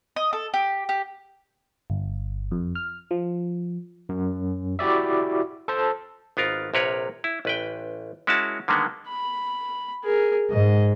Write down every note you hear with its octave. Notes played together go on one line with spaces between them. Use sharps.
D#5
A4
G4
G4
G1
F2
F6
F3
F#2
E4 F#4 G4 D5 E5
A4 C5 A5
G#1 B3 F4 A#4
A#1 C3 A#4 B4 C#5
E4
A1 B4 G5
G#3 C#4 E4 F#4 A#4 A5
D3 D#3 G3 G#3 A#3 B3
B5
G#4 A#4
G#2 D#5